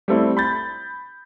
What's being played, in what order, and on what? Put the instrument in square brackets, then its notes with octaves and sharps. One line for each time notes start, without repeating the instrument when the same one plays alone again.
[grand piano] G3 A3 C4 E4
B5 G6 A6